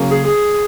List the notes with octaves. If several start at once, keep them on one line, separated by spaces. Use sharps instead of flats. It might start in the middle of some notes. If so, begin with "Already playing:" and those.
Already playing: C#3 F#3 A#3
G#4
G#4